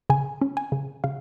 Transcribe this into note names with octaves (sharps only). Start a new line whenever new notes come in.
C#3 G#5
C#4
G#5
C#3
C#3 F5